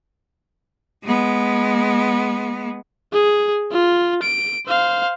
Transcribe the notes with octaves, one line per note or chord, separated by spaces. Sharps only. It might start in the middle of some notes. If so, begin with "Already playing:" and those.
G#3 B3
G#4
F4
D7
C5 F5